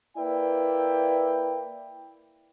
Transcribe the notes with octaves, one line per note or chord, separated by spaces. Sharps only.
A#3 E4 B4 D5 G5